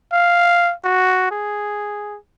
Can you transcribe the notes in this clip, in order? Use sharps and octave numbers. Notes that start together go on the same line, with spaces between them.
F5
F#4
G#4